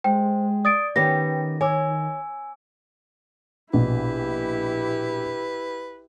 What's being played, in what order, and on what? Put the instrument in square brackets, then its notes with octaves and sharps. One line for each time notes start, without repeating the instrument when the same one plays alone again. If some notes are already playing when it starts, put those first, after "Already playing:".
[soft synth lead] G#3 [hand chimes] C5 [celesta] G5
[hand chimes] D5 [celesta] D#6 A6 D7
[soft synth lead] D#3 [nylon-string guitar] B3 C#4 G4 [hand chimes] B4 G5 [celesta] A#6
[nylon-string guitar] C#5 [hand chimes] G#5 D6 E6
[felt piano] A#1 B2 [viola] E4 G4 [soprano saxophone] B4